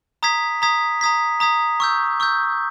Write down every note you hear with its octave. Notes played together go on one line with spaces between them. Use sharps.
A#5 D#6 G#6 B6
A#5 D#6 G#6 B6
A#5 D#6 G#6 B6
A#5 D#6 G#6 B6
C#6 E6 G6
C#6 E6 G6